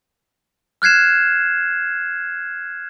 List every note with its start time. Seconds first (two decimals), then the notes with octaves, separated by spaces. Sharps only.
0.82 F6 F#6 G#6 C7 E7